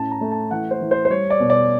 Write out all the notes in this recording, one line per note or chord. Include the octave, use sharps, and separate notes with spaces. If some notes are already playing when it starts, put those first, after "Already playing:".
Already playing: A2 C#4 A5
A#5
A3
A5
E3 F#5
C5
E3
C5
C5
G3 C#5
D5
B2
D5